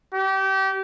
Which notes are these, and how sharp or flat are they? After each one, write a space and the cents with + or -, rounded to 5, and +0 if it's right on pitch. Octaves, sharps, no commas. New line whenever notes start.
G4 -30